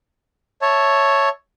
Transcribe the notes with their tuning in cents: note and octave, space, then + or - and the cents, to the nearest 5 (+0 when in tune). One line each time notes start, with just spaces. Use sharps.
C#5 +0 E5 +0 A5 +0